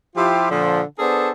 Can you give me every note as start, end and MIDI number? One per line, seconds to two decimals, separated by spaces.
0.16 0.49 53
0.16 0.49 64
0.16 0.49 65
0.16 0.49 67
0.50 0.81 46
0.50 0.81 50
0.50 0.81 53
0.99 1.31 59
0.99 1.31 62
0.99 1.31 68
0.99 1.31 69
0.99 1.31 72